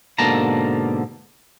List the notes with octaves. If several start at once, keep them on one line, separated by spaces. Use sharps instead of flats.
G#2 B2 D3 A#3 A5 A#5